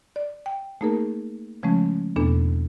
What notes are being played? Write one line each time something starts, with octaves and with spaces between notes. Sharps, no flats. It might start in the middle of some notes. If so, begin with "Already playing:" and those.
D5
G5
A3 A#3 D#4 G#4 A#4
C#3 F3 G#3 A3 C#4
E2 B2 A#3 B3 D4 A4